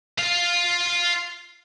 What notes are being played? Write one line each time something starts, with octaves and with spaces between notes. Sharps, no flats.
F4 F5